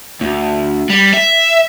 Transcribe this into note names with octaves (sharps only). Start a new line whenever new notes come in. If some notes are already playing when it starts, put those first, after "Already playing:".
D2
G3
E5